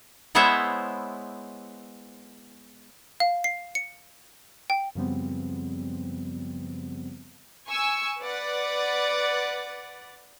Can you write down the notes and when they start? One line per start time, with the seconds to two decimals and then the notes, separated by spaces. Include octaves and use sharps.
0.35 G#3 B3 E4 C5 C#5 E5
3.20 F5
3.44 C7
3.75 C#7
4.70 G5
4.95 F#2 C#3 F3 G3 B3 C4
7.68 G#5 C#6 E6
8.20 B4 D5 F#5